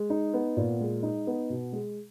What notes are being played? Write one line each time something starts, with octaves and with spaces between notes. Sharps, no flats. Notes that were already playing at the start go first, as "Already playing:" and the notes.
Already playing: G#3
D#4
B3
A#2
G#3
D#4
B3
B2
G#3